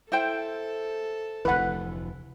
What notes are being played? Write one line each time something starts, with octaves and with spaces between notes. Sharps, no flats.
E4 A4 C5 G5
F1 D2 E3 B4 F#5